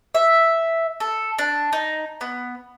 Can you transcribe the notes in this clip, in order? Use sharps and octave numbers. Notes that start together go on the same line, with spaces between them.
E5
A4
D4
D#4
B3